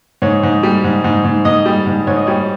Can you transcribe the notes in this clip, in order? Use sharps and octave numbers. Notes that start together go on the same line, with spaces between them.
G#2 C#5
G#2
G3
G#2
G#2
G#2
G#2 D#5
G3
G#2
G#2 C#5
D#5
G3 C#5